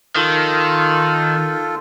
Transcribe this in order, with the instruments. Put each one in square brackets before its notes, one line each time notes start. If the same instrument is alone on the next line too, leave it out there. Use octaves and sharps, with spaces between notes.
[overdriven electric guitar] D#3 [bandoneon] F4 A4